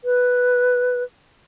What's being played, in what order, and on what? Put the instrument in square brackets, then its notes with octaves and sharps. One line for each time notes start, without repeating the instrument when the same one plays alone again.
[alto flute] B4